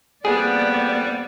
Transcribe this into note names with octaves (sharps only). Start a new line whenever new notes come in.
F2 G3 A#3 B3 G#4 D5